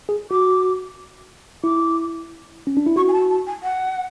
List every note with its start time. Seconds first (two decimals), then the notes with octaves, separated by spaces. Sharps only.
0.09 G#4
0.31 F#4 D6
1.64 E4 D6
2.67 C#4
2.77 D4
2.87 E4
2.96 F#4 C#6
3.08 G#5
3.13 A5
3.30 A5
3.47 G#5
3.63 F#5